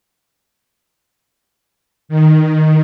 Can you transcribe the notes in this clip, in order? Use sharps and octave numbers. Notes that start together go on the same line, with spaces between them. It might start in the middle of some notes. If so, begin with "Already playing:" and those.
D#3